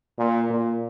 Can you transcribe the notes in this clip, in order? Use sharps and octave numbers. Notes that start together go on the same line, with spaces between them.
A#2
A#2